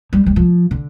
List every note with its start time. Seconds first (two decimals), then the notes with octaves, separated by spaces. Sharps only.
0.13 G3
0.26 G3
0.36 F3
0.71 D3